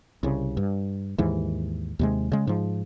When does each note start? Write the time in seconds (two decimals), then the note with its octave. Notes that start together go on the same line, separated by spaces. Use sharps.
0.23 C2 C#3
0.57 G2
1.18 D#2 G#2 E3
1.99 D#2 C3 G#3
2.32 C#3 G#3
2.47 G#2 F3